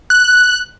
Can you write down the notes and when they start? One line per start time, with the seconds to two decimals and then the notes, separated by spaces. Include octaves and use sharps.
0.10 F#6